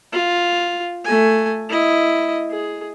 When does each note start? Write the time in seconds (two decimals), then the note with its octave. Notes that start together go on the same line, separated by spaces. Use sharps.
0.12 F4
1.05 A3 G#5
1.69 E4 D#5
2.50 G#4